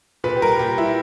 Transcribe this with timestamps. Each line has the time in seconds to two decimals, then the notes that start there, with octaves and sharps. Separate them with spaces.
0.24 A#2 B4
0.36 G4
0.42 G3 A#4
0.59 A#2 G4
0.78 G3 E4